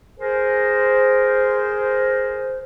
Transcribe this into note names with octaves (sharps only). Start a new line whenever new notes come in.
G#4 A#4 C5